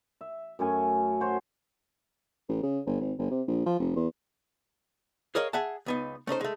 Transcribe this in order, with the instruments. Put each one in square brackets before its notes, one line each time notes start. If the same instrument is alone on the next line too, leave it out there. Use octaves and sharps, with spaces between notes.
[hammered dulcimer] E5
F#2 A3 C#4 G#5
F#4 C5 C#5
[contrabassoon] A1
C#3
G1
G#1
G1
C3
A#1
F3
F1
E2
[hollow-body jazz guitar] G#4 A#4 C#5 D#5 F5
G#4 E5 F#5 A5
C#2 B3 D#4
A3 C#4 D#4 C5
G#3 A3